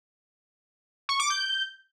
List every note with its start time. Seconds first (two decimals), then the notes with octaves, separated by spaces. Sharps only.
1.09 C#6
1.20 D6
1.30 G6